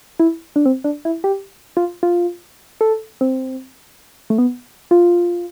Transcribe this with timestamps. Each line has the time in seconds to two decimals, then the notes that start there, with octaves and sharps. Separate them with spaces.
0.20 E4
0.56 D4
0.66 C4
0.84 D4
1.05 E4
1.24 G4
1.77 F4
2.03 F4
2.81 A4
3.21 C4
4.30 A3
4.38 B3
4.91 F4